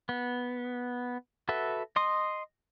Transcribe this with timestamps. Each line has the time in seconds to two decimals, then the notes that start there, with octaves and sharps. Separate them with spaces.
0.09 B3
1.49 F#4 A4 B4 E5
1.96 D#5 C6 D#6